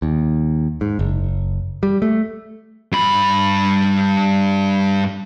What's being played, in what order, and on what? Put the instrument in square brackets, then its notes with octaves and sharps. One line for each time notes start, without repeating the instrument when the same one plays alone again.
[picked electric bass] D#2
G#2
F#1
G3
A3
[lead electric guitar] G2 B5